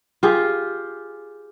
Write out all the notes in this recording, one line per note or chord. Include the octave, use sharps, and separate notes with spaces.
F4 G4 G#4